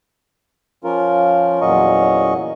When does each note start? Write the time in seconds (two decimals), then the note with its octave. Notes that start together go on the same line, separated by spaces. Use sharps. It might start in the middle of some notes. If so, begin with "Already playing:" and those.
0.84 F3 C#4 F4 A#4
1.61 E2 A#2 F#3 C#4 D#5 C#6